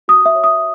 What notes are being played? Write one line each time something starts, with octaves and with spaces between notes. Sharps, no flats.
F#4 D#6
E5
C#5
D#6